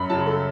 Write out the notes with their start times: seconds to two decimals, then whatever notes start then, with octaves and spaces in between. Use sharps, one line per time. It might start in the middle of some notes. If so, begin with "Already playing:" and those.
Already playing: F#2 B5
0.10 C#3 F#3 A5
0.26 A4